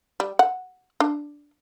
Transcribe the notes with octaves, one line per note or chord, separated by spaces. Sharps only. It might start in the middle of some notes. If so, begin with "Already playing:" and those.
G3
F#5
D4